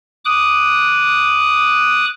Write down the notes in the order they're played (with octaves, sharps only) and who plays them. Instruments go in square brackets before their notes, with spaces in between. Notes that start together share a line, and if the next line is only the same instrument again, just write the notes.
[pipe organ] D6 D#6 F#6